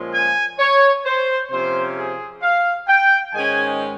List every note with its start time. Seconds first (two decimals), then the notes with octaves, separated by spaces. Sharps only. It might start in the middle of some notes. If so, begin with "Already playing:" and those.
Already playing: A#2 F3 G#3 C#4
0.13 G#5
0.59 C#5
1.05 C5
1.50 C3 F3 A#3 C#4 C5
1.97 G#4
2.42 F5
2.87 G5
3.33 G#2 D#3 G#3 C#4 G#5